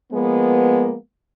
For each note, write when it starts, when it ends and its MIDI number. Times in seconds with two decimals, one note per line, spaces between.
0.11 0.93 53
0.11 0.93 56
0.11 0.93 58
0.11 0.93 59